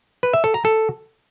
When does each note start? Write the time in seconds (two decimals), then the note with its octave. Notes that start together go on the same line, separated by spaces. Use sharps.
0.23 B4
0.33 E5
0.44 A4
0.54 A#5
0.65 A4